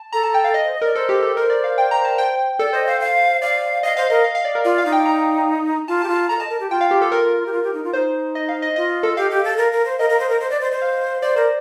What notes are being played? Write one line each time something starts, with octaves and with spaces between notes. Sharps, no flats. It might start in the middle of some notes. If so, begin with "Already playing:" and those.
Already playing: A5
A4 A#5
A5
G5
F5
D#5
C5
D#5
A#4 D5
A4 C5
G4
A4
A#4 C5
D5
F5
G5
A#5
A5
G5
A4 D5
C5 D#5
C5 F5
F5
D5 F5
D#5 F5
C5 F5
A#4 D#5
F5
F5
D5
A#4
F4 D5
F5
D#4
G5
A#5
F4 A5
G4 A5
F4
A5
A4 A#5
D#5 A5
A#4
G4
F4 G5
F5
G4
A4
A#4
G4
F4
G4
D#4
F4
D#4 C5
D#5
F5
D#5
F4 D#5
A4
G4 F5
G4
A4
A#4
A#4
C5
A#4 D#5
A#4
C5
A#4
C5
D5
C5
C5
F5
C5 D5
A#4 C5